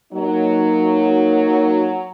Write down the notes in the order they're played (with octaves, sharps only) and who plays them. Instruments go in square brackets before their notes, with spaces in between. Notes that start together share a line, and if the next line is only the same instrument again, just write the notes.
[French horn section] F#3 [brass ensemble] A#3 D#4 F#4